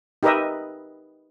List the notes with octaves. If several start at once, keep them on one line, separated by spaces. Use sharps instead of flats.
D#4 G4 A#4 B4 D#5 E5